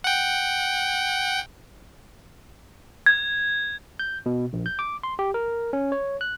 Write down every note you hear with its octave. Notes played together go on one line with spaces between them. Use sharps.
F#5 G5
G#6
G6
B2
A#1
G6
D6
C6
G4
A#4
C#4
C#5
F#6